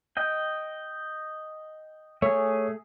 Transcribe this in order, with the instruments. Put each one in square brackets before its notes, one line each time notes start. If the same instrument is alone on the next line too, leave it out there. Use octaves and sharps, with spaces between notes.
[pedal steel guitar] D#5 G5
[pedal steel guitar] A3 G#4 [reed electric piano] C#5